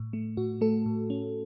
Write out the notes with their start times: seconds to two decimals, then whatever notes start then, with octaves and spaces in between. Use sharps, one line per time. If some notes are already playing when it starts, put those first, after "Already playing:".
Already playing: A2
0.13 A3
0.37 A2 F#4
0.61 A3 A4
0.86 A2
1.10 C#4